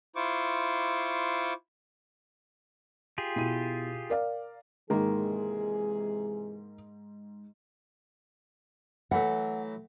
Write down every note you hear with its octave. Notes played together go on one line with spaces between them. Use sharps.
E4 F4 C5 C#6 D6
F4 G4 G#4
B2 E4 D#7
A#4 D5 F5
G#2 C3 D#3 E3 A#3 G#4
E3 F#3 A3 F#5